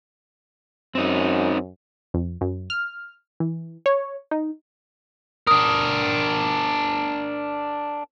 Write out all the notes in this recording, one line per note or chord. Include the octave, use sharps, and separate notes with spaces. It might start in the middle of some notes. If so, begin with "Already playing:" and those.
F#2 C4 D#4
F2
F#2
F6
E3
C#5
D#4
D4 A#4 D#6